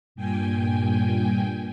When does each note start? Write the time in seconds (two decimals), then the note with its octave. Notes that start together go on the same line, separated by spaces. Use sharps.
0.15 G2 A#2 G5 G#5